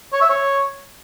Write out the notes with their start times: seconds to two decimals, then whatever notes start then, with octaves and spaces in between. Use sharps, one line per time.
0.13 C#5
0.21 E5
0.30 C#5